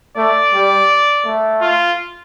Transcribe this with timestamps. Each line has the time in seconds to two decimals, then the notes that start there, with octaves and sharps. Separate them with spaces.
0.17 A3 D5
0.54 G3
1.25 A3
1.62 F4